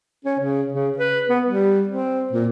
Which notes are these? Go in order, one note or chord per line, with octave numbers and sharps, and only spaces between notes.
C#4
C#3
C#3
B4
B3
G3
C4
A#2